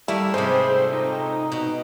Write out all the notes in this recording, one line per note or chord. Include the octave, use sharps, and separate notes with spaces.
D#3 G3 A3 A#3 E4
G#2 C3 G3 B3 G#4 C5
A#2 A3 C4
D#4
B2